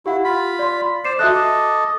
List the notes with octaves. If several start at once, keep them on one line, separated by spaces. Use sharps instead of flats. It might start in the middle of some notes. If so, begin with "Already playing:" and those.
E4 G4 F5 F#5
F4 B5
D5 C6
C5 D5 C7 E7
F#4 A4 D#5 E5 F#6
D6